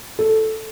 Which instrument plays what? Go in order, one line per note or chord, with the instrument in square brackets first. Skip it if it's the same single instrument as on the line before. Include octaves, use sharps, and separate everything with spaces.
[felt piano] A4